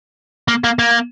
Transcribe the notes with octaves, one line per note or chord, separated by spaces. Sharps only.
A#3
A#3
A#3